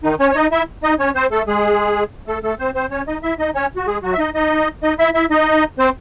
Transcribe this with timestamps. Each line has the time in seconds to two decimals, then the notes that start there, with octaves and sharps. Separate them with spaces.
0.03 D#3 D#4
0.20 C#4 C#5
0.31 C#5
0.36 D#4 D#5
0.52 E4 E5
0.83 D#4 D#5
0.99 C#4 C#5
1.15 C4 C5
1.31 A3 A4
1.48 G#3 G#4
2.27 A3 A4
2.43 A3 A4
2.59 C4 C5
2.75 C4 C5
2.91 C#4 C#5
3.07 D#4 D#5
3.23 E4 E5
3.39 D#4 D#5
3.55 C#4 C#5
3.76 F#4
3.87 G#3 G#4
4.03 F#3 F#4
4.13 E5
4.19 D#4 D#5
4.35 D#4 D#5
4.83 D#4 D#5
4.99 E4 E5
5.14 E4 E5
5.31 D#4 D#5
5.79 C4 C5